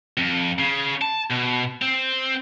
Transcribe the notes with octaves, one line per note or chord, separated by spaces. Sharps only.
F2
C#3
A5
B2
C4